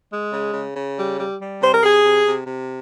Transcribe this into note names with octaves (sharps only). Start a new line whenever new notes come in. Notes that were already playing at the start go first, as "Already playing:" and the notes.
G#3
C#3
C#3
C#3
G3
G3
G3
C3 C5
A#4
C3 G#4
C3
C3
C3